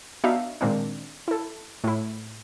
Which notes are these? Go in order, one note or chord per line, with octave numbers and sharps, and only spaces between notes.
B3 D4 D#4 F#4 E5 F5
A#2 D#3 G#3 A#3 C4 D4
E4 A4
A2 E4